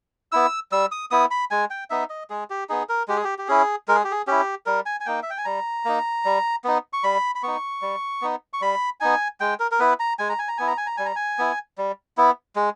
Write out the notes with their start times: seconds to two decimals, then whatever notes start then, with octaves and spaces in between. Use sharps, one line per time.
0.32 B3 E4 E6
0.72 G3 E6
0.92 D#6
1.11 B3 E4 D#6
1.31 B5
1.51 G#3 G#5
1.70 G5
1.90 B3 D#4 E5
2.10 D#5
2.30 G#3 G#4
2.50 G4
2.69 B3 D#4 G#4
2.89 A#4
3.08 G#3 G4
3.16 G#4
3.24 G4
3.38 G4
3.48 C#4 E4 G#4
3.88 G#3 A#4
3.95 G#4
4.04 G4
4.11 G#4
4.27 C#4 E4 G4
4.66 G3 A#4
4.86 G#5
5.00 G#5
5.06 A#3 D#4 G5
5.23 E5
5.30 G5
5.38 G#5
5.45 G3 A#5
5.85 A#3 D#4
6.25 G3
6.64 B3 D#4
6.93 C#6
7.04 G3 B5
7.35 B5
7.43 B3 D#4 C#6
7.82 G3
8.22 B3 D#4
8.53 C#6
8.61 G3 B5
9.00 B3 D#4 G#5
9.40 G#3 G5
9.60 A#4
9.71 A#4
9.79 B3 E4 B4
10.00 A#5
10.19 G#3 G#5
10.29 A#5
10.39 G#5
10.48 A#5
10.58 B3 E4 G#5
10.67 A#5
10.78 G#5
10.87 A#5
10.97 G3 G#5
11.06 A#5
11.16 G#5
11.38 B3 E4
11.78 G3
12.17 B3 E4
12.56 G#3